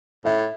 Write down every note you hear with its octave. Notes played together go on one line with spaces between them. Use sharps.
A2 E5